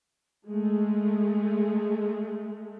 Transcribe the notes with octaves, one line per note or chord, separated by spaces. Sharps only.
G#3 A3